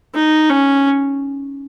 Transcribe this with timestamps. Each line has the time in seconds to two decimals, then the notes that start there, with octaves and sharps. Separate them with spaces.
0.15 D#4
0.50 C#4